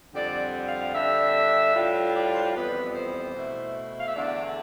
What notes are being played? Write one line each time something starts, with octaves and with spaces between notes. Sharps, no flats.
F2 D3 G3 D5
F5
F5
D3 G3 D4 E5
A2 G3 D4 F4
D5
D5
C5
F2 E3 G3 B3 B4
C5
B2 A3 E4
F5
E5
E2 D3 A3 D4 D5